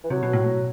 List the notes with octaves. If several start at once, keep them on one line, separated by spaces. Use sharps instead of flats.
E3
C3 F#3
B2
A2
B2